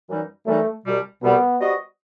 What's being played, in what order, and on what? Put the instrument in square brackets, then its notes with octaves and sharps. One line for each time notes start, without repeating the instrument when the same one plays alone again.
[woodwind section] F#2 E3 G3 D#4
[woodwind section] F#2 E3 G3 D#4 [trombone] A3
[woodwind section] C2 B2 G3
[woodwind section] C2 B2 G3 [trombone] B3
[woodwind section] G3 B3 F#4 C5 D#5